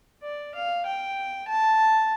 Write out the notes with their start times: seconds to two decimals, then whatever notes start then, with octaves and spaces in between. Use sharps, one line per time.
0.22 D5
0.54 F5
0.86 G5
1.48 A5